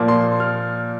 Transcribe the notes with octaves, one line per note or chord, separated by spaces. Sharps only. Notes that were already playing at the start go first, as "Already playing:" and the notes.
Already playing: A#2 F3 A#3
C6
F6